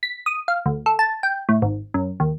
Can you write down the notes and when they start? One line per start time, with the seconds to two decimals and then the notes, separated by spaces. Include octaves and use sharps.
0.03 B6
0.26 D#6
0.48 F5
0.66 D2
0.86 A4
0.99 A5
1.23 G5
1.49 A2
1.62 G#1
1.94 F#2
2.20 D#2